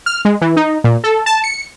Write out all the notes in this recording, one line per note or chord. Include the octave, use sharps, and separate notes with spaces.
F6
G#3
E3
D#4
A#2
A4
A5
C#7